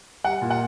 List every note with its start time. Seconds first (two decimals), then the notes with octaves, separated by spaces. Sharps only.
0.24 G3 F#5
0.42 A#2
0.50 F#5